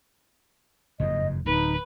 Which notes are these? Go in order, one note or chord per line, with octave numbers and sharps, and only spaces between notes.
F#1 F2 G#2 D#5
D1 D#4 B4